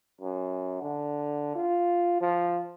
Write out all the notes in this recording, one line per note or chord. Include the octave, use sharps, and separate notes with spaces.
F#2
D3
F4
F3